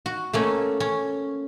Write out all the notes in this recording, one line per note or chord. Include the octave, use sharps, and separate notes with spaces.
F#4
A3 A#3 C#4
C#4